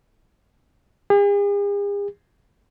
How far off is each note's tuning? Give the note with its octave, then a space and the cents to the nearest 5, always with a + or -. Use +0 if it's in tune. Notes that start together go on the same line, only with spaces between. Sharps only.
G#4 -45